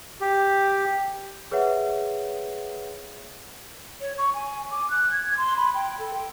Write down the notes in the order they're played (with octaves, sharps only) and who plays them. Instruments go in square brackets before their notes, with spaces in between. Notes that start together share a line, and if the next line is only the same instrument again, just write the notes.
[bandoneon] G4
[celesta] G#4 B4 C#5 E5 F#5
[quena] C#5
C#6
G#5
D6
F#6
G#6
C6
B5
G5
A4
G5